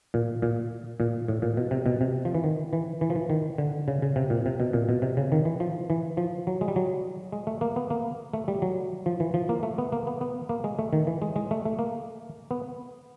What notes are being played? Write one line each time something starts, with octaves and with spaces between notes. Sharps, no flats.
A#2
A#2
A#2
A2
A#2
B2
C3
B2
C3
F3
E3
D#3
E3
E3
F3
E3
D#3
D3
C#3
C#3
C3
A#2
C3
B2
A#2
B2
C3
C#3
D#3
E3
F3
E3
F3
F#3
G#3
G3
F#3
G#3
A3
A#3
B3
A#3
A3
G3
F#3
F3
E3
F3
A#3
A3
B3
A#3
B3
B3
A#3
G#3
A3
D#3
E3
G#3
G#3
A3
A3
A#3
B3